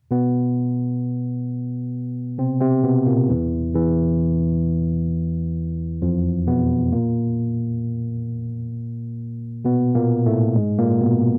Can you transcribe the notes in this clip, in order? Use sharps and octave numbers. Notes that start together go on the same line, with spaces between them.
B2 B3
C3 C4
C3 C4
B2 B3
A#2 A#3
E2 E3
E2 E3
F2 F3
B2 B3
A#2 A#3
B2 B3
A#2 A#3
A2 A3
G#2 G#3
A#2 A#3
B2 B3